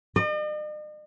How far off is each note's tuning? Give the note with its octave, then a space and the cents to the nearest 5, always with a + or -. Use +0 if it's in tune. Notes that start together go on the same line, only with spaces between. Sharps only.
D#5 -45